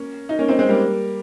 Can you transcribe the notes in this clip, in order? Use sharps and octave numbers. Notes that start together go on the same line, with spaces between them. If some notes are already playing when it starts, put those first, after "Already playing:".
Already playing: A#3 C#4
D#4
A#3 C#4
C4 D#4
G#3 C4
G3 A#3